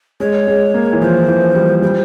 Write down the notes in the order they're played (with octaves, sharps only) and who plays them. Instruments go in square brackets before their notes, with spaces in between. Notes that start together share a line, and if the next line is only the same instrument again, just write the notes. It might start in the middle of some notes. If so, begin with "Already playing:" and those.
[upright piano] G#3 [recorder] C#5
[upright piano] G#3
A#3
E3
[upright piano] F3 [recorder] C5
[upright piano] E3
G3
[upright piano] G3 [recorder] C5